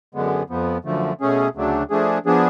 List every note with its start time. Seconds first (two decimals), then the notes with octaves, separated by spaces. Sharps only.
0.14 F#2 D3 G#3 B3
0.50 F2 F3 B3
0.85 F#2 D3 F3 A3
1.20 B2 A3 C#4 G#4
1.55 D2 C#3 F#3 A3 D4
1.90 F3 A3 D4 G#4
2.26 F3 B3 D4 G#4